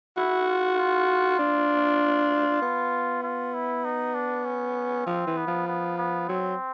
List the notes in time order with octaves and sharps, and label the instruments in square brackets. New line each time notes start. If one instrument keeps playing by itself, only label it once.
[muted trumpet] E4 [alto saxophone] F#4
[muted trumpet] F4
F4
[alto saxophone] D4
B3
[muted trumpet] F4
E4
D#4
D4
C#4
[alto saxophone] F3 [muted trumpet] C4
[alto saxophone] E3
[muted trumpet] B3
[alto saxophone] F3
[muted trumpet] B3
B3
[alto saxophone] F#3 [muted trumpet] C4